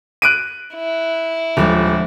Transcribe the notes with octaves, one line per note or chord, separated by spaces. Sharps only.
F#6 D7 D#7
E4
D#1 D3 F3 G#3